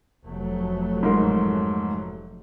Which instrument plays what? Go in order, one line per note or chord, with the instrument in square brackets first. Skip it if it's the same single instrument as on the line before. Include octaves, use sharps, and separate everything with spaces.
[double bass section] F1 F#3 A3
[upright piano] G#2 A#4 C6